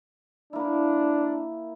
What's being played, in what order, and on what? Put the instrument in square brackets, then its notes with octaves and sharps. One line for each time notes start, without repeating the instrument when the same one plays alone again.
[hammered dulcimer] A#3 E4 [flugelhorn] D4